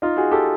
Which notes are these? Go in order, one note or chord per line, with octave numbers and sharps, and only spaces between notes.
D#4 F4
F#4 G#4
G4 A4